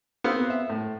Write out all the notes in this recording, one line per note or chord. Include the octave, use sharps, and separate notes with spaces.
B3 C4 F5
E5
A2